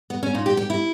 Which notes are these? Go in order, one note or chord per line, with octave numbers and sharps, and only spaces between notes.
B3
C#4
A#2 D#4
G4
G4
E4